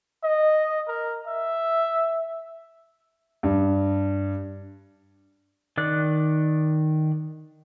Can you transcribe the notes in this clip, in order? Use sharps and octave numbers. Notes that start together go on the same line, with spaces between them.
D#5
A#4
E5
G2
D#3 D5 F#6